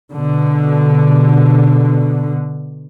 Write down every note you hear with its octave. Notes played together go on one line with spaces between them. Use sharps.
B2 D3